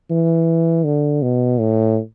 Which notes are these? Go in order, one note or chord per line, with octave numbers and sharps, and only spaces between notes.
E3
D3
B2
A2